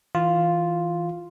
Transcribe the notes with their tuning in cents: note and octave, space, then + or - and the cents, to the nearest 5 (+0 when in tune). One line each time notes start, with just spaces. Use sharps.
E3 -10 F4 +0